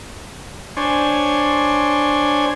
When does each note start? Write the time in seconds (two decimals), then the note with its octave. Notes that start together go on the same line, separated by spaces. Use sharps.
0.77 D4 C5 C#5 G#5